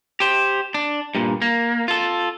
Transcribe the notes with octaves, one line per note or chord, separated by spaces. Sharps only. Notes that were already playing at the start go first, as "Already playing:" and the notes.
G4 C5
D4
G2 A#2
A#3
F4 A4